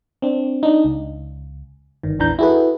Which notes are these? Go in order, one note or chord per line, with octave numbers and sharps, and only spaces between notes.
C4 D4
D4 D#4
C#2
G1 D#3
A#1 E2 E3 D4 A#5 G6
E4 F#4 G#4 A4 B4